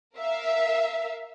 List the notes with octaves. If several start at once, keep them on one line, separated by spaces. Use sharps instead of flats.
A#4 E5 F5